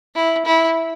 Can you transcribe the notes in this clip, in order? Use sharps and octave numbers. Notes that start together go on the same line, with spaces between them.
E4
E4